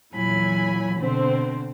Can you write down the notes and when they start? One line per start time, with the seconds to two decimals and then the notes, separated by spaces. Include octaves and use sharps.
0.15 E2 A#2 F#3 E4 G#5 B5
0.99 B2 D3 C4 C5